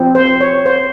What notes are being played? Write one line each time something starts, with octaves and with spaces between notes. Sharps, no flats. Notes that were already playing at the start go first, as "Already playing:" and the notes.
Already playing: F3 C4
C5
C#5
C5